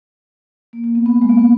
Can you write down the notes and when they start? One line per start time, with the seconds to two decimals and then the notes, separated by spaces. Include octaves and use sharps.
0.73 A#3
0.84 A#3
0.95 B3
1.06 B3
1.21 G#3
1.29 A#3
1.38 B3